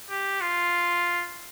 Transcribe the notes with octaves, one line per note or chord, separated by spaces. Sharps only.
G4
F4